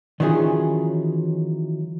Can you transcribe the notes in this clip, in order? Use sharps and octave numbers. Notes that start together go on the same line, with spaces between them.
D#3 E3 F#3 C#4 F4 G#4